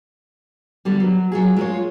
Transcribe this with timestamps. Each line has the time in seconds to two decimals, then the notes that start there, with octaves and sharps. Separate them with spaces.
0.85 D3 G3 B3
1.00 F#3
1.32 F#3 F4 G#4
1.56 G#3 F4 C#5